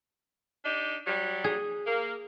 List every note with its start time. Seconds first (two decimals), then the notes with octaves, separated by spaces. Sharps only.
0.65 D4 D#4 G4
1.07 F#3 G3
1.44 G#4
1.87 A#3